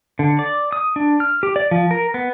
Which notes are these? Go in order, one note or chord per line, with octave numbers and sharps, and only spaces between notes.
D3
D5
D#6
D4
F6
G4
D5
F3
A#4
B3